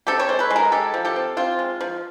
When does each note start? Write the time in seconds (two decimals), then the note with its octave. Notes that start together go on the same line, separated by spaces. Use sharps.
0.07 C4 G4 A4
0.20 C#5
0.29 G#3 C5
0.39 A4 B4
0.50 G#3
0.56 G#4 A#4
0.72 G#3 G4 A4
0.94 F3
1.05 G4 A4
1.16 C4
1.37 C4 F4
1.59 G#3
1.81 F3